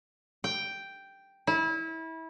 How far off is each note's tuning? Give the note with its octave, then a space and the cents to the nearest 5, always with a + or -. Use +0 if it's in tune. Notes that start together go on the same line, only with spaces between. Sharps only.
G5 +0
E4 -25